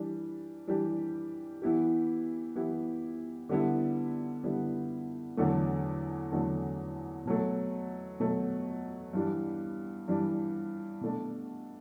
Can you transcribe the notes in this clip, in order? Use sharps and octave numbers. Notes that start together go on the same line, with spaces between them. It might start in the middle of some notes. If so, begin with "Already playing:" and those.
Already playing: E3 G3 D4
E3 G3 D4 G4
E3 B3 E4 G4
E3 B3 E4 G4
D3 G3 B3 E4
D3 G3 B3 E4
E2 D3 F#3 A3
E2 D3 F#3 A3
B2 F#3 A3
B2 F#3 A3
G2 E3 G3 D4
G2 E3 G3 D4
B2 A3 D4